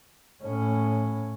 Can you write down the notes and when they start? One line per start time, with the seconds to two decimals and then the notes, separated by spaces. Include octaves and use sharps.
0.42 A2 C#4